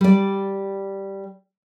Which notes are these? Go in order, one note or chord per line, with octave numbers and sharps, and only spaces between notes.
G3 D5